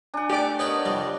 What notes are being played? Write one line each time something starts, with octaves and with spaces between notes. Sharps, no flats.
D4 F#5 G#5
A3 G4 D5 D6
B3 D#4 A#4 B4 C#5 D#6
C2 F2 G3 D#5 A#6